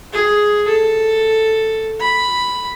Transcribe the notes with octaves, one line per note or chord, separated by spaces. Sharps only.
G#4
A4
B5